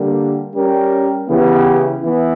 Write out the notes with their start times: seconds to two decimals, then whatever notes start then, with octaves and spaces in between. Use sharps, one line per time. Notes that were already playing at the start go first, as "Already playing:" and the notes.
Already playing: D3 G3 A#3
0.54 G3 C#4 G4 A#4
1.28 C#3 E3 B3 E4 G4
2.01 E3 B3 E4